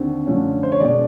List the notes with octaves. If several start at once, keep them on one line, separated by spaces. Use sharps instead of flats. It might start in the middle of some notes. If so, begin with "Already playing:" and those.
Already playing: D#2 D3 C4
F#2 D3 F3 A3 C#4
C5
C#5
E1 B2 D5